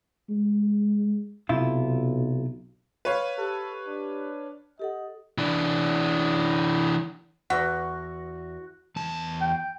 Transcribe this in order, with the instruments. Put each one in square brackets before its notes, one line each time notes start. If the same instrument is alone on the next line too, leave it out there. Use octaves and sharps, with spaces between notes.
[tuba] G#3
[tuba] B1 [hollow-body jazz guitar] C3 E4 F4
[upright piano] B4 C#5 F5
[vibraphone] G4 [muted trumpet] A4
[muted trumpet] D4
[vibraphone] G4 A4 F#5 [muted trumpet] D#5
[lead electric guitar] E3 D4
[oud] E2 [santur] F#4 [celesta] F#5
[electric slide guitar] E2 A5
[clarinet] G5